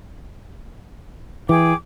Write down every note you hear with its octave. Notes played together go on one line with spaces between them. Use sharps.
E3 G#4 G5 D6